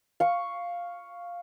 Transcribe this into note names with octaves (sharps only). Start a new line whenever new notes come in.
F5 C#6